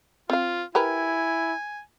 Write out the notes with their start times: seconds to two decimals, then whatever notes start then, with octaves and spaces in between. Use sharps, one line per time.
0.30 C4 F4 F5
0.75 E4 G4 A#4 B4 G#5